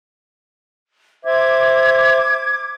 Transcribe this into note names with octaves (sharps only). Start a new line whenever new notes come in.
C5 E5 D6 G#6